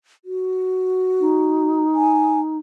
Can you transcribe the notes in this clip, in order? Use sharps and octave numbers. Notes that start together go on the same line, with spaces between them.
F#4
D#4
G#5